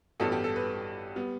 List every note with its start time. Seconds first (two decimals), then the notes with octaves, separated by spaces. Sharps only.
0.20 A1 G2 G3 B3 A4
0.32 G4
0.44 A4
0.56 B4
1.16 G3 B3